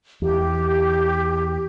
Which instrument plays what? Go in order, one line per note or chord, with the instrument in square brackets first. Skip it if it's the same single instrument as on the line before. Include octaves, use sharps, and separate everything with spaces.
[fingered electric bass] E2 [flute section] G4